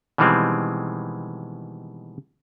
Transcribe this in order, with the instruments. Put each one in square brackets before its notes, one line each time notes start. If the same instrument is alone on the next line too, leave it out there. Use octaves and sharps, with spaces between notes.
[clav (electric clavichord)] B2 D#3 E3 G3 G#3 C4